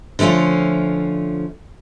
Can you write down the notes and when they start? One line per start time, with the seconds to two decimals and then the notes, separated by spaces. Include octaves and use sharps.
0.19 D3 F3 A3 C#4 F4